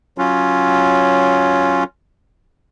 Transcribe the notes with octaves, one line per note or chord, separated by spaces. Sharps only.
F#3 C#4 F4